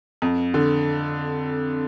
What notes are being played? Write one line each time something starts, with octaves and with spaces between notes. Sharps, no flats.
F2
D3